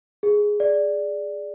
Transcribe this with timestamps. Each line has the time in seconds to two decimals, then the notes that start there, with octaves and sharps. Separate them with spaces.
0.23 G#4
0.60 D5